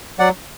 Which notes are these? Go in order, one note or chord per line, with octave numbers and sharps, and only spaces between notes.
F#3 D5 F#5